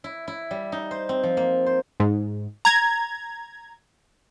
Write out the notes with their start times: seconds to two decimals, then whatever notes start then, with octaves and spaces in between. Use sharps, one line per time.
0.04 E4
0.28 E4
0.51 G3
0.72 D#4
0.91 C5
1.09 C4
1.23 F3
1.37 A#3
1.66 C5
2.00 G#2
2.65 A#5 G#6